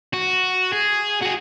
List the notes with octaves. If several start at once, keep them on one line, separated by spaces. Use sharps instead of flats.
F#4
G#4
F#4 G#4